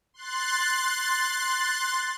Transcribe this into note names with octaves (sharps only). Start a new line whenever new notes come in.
C6 F#6 A6